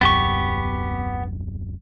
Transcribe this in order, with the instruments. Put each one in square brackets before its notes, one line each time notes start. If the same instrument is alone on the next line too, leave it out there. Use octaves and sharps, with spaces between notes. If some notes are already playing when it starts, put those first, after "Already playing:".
[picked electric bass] D#1 C2 F#2 [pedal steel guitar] B3 G4 C#6